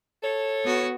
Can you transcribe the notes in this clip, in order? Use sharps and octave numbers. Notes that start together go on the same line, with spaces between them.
A4 C#5
B3 F#4